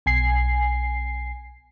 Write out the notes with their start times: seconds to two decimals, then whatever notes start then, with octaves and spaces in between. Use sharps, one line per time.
0.06 B1 G#5 C7